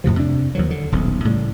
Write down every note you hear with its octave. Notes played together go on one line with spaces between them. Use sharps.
F2 A2 C3 F3
C3 D4
D#2 D#3 F3 F#3
D3
D#1 B1 C3
A2 C#3 G3